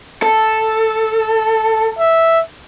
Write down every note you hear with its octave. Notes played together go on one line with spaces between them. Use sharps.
A4
E5